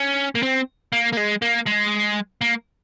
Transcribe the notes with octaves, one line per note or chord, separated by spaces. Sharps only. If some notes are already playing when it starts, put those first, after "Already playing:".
Already playing: C#4
A#3
C4
A#3
A#3
G#3
A#3
G#3
A#3